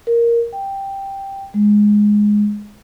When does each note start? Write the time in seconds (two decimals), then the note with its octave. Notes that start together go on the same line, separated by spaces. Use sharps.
0.07 A#4
0.53 G5
1.54 G#3